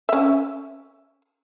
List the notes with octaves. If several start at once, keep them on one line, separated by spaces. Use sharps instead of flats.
C#4 E5